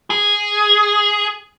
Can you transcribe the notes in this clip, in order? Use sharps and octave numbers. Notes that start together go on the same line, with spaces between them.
G#4